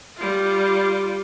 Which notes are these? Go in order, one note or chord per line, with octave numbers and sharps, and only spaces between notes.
G3 F4